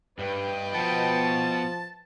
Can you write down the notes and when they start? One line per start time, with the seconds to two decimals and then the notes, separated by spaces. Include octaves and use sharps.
0.19 G2 B4 D#5 G5
0.74 B2 F3 B3 A5